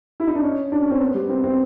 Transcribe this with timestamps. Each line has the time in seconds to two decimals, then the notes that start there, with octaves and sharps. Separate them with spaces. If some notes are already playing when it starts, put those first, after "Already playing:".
0.20 E4
0.27 D#4
0.35 D4
0.42 C#4
0.72 D4
0.82 C#4
0.90 C4
1.00 B3
1.14 G3
1.29 C4
1.44 C4